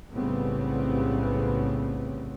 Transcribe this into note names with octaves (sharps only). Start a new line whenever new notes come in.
B1 A2 C#3 G3 B3 C4